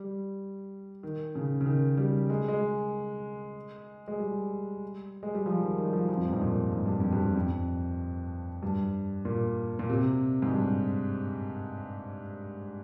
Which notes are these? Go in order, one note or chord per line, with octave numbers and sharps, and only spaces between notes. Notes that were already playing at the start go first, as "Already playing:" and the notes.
Already playing: G3
D#3
C#3
C#3
D#3
G3
G#3
G#3
G#3
G3
G#3
G3
F3
D#3
D#3
G3
F3
F3
F2
G2
G#2
A#2
G#2
G2
F2
G2
F2
G2
A#2
A#2
C3
G#2
G2